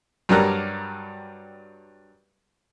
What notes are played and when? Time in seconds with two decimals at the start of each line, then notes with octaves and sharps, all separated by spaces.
0.29 G2 F#3 G3 A#4 A#5 F#6